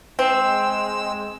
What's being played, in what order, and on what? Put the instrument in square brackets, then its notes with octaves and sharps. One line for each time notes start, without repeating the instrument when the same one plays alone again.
[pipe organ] G#3 E6 [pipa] C4